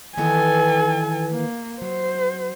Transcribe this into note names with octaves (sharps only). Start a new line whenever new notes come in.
D#3 E3 B3 A4 G#5
A#3
F#3 C5